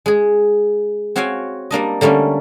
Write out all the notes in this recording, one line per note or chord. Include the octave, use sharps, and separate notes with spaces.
G#3 G#4
C4 F#4 C#5 F5 G5 G#5
G3 A#3 D4 D#5
D3 G3 A3 A#3 C#4